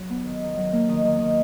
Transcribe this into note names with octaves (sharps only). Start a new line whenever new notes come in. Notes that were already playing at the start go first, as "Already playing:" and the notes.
Already playing: F#3
B3
D#3
D#3
F#3
A#3
D#3
D#3
D#3